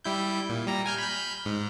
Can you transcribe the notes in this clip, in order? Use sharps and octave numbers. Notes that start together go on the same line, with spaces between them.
G3 E4 G6
A#2
G3 A#5
G#5 F6 G6
B5 F6 G6
G#2